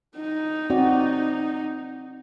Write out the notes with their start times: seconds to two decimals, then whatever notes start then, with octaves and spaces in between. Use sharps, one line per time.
0.17 D#4
0.70 C4 F#4 D5